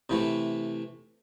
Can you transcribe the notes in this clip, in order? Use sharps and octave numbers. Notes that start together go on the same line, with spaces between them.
C3 E3 A3